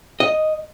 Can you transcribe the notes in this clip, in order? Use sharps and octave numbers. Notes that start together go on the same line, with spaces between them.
D#5